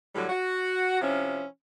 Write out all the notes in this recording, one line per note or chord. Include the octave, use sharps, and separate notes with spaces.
A2 D3 F#3 G3
F#4
C3 F3 C#4 E4